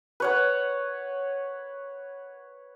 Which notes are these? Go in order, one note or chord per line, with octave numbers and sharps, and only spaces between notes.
B4 C#5 F#5